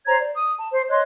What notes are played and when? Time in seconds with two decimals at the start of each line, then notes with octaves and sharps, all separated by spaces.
0.07 C5 C#5 A#5 G#6
0.19 D5
0.34 D#6
0.58 A5
0.72 C5
0.90 C#5 D#5 C6 F#6